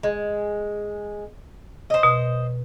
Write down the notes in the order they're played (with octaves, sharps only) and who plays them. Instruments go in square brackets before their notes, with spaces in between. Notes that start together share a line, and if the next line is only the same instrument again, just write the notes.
[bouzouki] G#3
C5 D#5
[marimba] B2